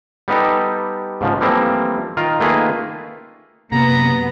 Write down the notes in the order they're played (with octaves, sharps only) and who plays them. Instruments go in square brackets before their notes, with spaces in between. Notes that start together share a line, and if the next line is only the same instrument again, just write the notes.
[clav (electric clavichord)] G3 B3 D#4 G4 A4
G#2 C#3 F3
E3 F3 G3 A3 A#3 C4
D#3 F4 A#4
D#3 A3 A#3 F4 G#4 B4
[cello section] F#2 B3 [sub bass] C3 [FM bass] A#3 [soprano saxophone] A#5